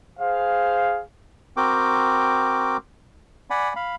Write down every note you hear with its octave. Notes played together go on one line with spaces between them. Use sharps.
G#4 C5 F5
C4 F#4 A#4 G5 D6
D5 F#5 G#5 B5
F5 B5